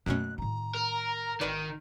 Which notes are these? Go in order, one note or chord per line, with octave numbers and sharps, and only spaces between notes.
F#2 B2 A3 A#3 C#4 F#6
A2 D#3 A#5
A#4
G#1 D#3 B4 D5